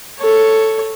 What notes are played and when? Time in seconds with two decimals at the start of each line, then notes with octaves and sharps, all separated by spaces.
0.20 A4 C#5